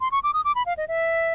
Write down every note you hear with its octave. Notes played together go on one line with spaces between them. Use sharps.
C6
C#6
D6
D#6
D6
B5
F5
D#5
E5